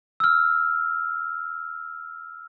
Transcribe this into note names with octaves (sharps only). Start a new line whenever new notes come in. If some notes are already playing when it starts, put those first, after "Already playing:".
E6 F6